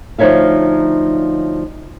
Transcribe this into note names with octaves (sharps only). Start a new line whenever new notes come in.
D2 F3 D#4 C#5 E5 F5